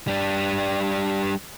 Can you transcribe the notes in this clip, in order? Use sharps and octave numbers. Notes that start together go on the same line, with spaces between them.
G3 D4